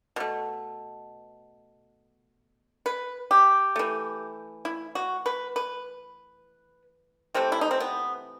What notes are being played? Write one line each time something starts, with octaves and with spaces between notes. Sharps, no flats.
B2 A3
B4
G4
E3 A3
E4
F#4
B4
B4
C3 E3 A3 C4
E4
D#4
C4
B3